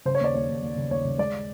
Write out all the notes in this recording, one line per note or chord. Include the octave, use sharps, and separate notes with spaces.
C#3 C5
C#5
D#2 D5
D#2 C#5
D#2
D#2
C#3
D#2 C#5
C#3
G#3 D5